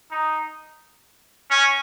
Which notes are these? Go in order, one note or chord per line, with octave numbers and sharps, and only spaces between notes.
D#4
C#4